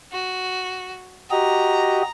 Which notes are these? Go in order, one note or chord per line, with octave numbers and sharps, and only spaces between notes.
F#4
F#4 G4 D#5 A#5